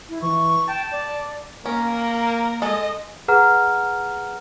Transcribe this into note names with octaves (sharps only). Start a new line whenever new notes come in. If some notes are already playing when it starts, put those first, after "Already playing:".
E4
E3 C#6
G5 A5
D5
A#3 C#4 A#4
G#3 A4 D#5
G#4 B4 F#5 A#5 F6